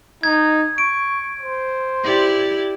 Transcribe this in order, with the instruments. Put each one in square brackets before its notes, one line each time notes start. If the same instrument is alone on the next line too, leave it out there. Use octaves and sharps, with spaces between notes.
[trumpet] D#4 [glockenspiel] G#6
[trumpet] C#6 [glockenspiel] D7
[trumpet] C5
[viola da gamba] E4 G4 D5